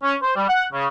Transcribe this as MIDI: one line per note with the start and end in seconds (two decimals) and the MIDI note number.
0.03 0.15 61
0.22 0.36 72
0.36 0.47 55
0.48 0.65 78
0.73 0.87 49